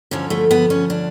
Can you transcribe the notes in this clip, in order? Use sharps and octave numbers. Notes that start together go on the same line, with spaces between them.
D2 D3 F3 C#4
A3
B3
C#4
D4